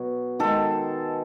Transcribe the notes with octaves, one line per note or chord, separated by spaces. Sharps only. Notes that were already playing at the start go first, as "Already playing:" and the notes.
Already playing: B2 F#3
D#3 G#3 A4